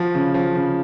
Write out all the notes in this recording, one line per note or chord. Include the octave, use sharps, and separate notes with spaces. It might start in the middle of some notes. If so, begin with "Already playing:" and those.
Already playing: F3 F#4
C#3
F3
C#3